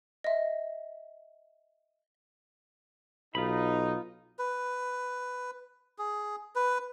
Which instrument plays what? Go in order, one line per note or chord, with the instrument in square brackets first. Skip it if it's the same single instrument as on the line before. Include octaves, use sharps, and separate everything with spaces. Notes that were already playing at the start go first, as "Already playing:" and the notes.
[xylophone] D#5 E5
[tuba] B1 [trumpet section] D#4 [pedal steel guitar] F4 B5
[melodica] B4
G#4
B4